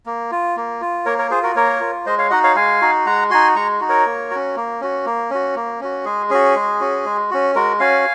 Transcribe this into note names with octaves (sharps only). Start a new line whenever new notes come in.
A#3
F4
A#3
F4
A#3 A#4 C#5
A#4 C#5
F4 G#4 C5
F#4 A#4
A#3 A#4 C#5
F4
G#3 C5 D#5
C#5 F5
D#4 F#4 D#5 F#5
C#5 F5
G#3 F5 G#5
D#4 F#4
G#3 F#5 A#5
D#4 F#4 G#5 C6
G#3 A#5 C#6
D#4 F#4
A#4 C#5
A#3
C#4 F#4
A#3
C#4 F#4
A#3
C#4 F#4
A#3
C#4 F#4
G#3 G#4
C#4 F#4 G#4
G#3
C#4 F#4
G#3
C#4 F#4
G#3 F#4 A#4
C#4 F#4 F5 G#5